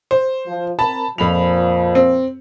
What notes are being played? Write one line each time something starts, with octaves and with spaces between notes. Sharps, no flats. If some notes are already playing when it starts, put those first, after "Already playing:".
C5
F3
C4 A#4 A5 B5
F2 A#2 F3 B5 F7
C4